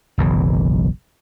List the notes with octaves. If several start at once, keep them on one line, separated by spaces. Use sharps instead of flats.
F#1 B1 E3